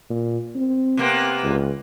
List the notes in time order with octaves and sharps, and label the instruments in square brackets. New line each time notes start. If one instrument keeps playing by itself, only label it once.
[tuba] A#2
C4
[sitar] C3 A#3 B3
[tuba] C#2